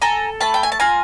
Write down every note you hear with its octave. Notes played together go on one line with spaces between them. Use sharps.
A4 G#5 A#5
A3 A5 B5
G5
G#5
A5
F4 G#5 A#5